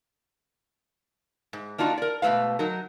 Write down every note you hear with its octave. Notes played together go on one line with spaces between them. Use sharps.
G#2
A#3 D4 D#4 F4 F#4
A#4 D5
G#2 B2 E3 A3 B4 F5
F#3 D#4 A#4